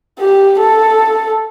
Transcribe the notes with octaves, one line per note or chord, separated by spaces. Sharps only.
G4
A4